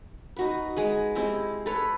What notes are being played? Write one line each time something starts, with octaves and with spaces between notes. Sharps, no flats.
D#4 F#4 B4
G#3 G#4 B4
G#3 C4 E4 G4
A4 B4 C#5